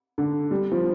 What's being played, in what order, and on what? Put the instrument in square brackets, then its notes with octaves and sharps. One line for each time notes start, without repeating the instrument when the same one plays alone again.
[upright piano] D3
G3
F3